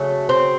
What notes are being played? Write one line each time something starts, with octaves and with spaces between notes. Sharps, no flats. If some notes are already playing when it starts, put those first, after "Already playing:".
Already playing: C#3 F#3 A3
C4